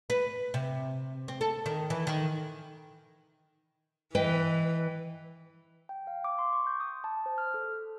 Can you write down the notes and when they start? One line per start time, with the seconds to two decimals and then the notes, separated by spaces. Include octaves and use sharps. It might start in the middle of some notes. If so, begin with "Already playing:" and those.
0.10 B4
0.54 C3
1.28 C4
1.41 A4
1.66 D#3
1.90 E3
2.07 D#3
4.15 E3 B4 D#5 G5
5.89 G5
6.07 F5
6.24 D6
6.39 C6
6.53 C#6
6.67 G6
6.80 D#6
7.04 A5
7.26 C5
7.38 F6
7.54 A4